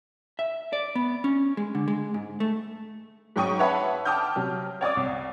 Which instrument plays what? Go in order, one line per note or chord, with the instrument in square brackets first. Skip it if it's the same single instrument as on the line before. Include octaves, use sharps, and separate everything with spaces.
[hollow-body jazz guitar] E5
D5
B3
C#4
G#3
D3
G#3
G#2
A3
[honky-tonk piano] G#2 F#3 G5 C#6 D#6 D#7
B4 C#5 E5 F#5 A5 B5
G5 A5 D6 D#6 F6 G6
C3 F#3
C#5 D5 D6 D#6
C2